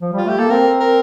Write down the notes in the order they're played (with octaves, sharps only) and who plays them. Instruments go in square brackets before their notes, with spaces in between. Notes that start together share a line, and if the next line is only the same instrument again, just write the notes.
[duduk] F3
[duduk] G3 [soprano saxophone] F4
[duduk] A3 [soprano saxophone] G4
[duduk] A#3 [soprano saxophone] A4
[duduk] C4 [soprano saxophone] A#4
[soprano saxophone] A#4